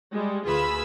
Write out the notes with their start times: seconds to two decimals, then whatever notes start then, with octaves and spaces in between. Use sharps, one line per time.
0.12 G3 G#3
0.45 D2 F4 G#4 B4 B5 E6